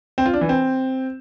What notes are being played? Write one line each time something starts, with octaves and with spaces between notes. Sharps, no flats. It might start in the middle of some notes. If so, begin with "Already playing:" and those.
C4
F4
D4
E3
C4